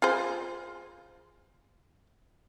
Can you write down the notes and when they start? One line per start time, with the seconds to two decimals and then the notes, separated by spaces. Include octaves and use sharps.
0.02 F4 G#4 C5